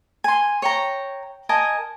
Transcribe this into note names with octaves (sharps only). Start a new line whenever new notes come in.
G#5 C6
C#5 G5 A#5
A#4 D#5 G#5 A5